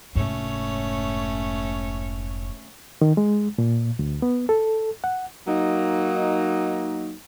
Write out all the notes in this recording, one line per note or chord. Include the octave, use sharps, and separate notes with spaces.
F1 G#2 A3 C#4 C#5
D#3
G#3
A#2
D2
B3
A4
F#5
F#3 A#3 D#4